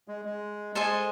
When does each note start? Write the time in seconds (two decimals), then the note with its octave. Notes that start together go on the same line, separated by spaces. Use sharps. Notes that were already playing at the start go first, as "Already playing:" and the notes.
0.08 G#3
0.25 G#3
0.75 G#3 A4 C5 D#5 G#5